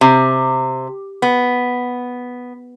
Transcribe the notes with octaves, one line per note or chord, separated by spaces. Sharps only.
C3
B3